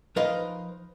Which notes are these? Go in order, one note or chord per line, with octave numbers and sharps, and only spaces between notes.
F3 D#4 A#4 B4 D#5 F5